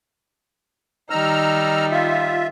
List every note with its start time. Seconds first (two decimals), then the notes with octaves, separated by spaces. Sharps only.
1.10 D#3 G3 D#4 A#5 E6 F6
1.91 F4 E5